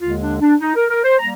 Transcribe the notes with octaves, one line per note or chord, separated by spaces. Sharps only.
D#2 D3 G#3 F4
D4
D4
D#4
A#4
A#4
C5
G3 A#3 A#5